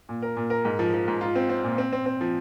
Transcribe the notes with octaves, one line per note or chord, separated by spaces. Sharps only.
A#2
A#4
A#2
A#4
G#2
F3
F3
G#2
F4
C4
C4
A#2
C4
C4
C4
F3